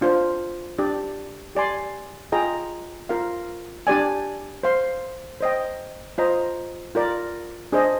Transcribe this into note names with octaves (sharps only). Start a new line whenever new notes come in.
D4 F4 C5
D4 G4 D5
G4 D5 G#5 C6
F4 G#4 D#5 G5 A#5
F4 A#4 F5
D4 G4 D5 G#5
C5 F5 C6
C5 D#5 G5
F4 C5 D#5 A#5
F4 A#4 D5
D4 G#4 C5 D#5